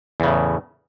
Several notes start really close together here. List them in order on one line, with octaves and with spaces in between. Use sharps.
E2 C#3 A2